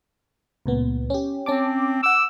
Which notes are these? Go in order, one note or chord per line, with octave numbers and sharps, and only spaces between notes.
C#2 A#2 B3
C#4 G4
C4 C#4 A5 D6
F#5 D6 E6